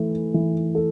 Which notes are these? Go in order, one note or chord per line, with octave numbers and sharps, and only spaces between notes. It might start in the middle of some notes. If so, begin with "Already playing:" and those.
Already playing: E3 A3
E3
A4